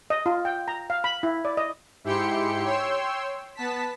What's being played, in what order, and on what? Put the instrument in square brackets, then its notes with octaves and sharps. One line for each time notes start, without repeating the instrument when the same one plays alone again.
[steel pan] D#5
F4
G5
A#5
F5
B5
E4
D5
D#5
[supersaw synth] G#2 E4 G4 G5 C6 C#7
C#5 G5 C6 E6
B3 A5 B6